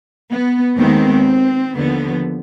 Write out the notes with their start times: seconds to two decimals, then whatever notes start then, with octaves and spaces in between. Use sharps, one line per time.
0.29 B3
0.77 D#2 D#3 G#3 B3 C4
1.76 D#2 D3 F3 B3